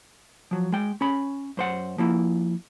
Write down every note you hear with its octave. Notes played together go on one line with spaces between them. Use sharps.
F3 F#3
G#3 G5
C#4 B5
F#2 C5 F#5
F3 A#3 E4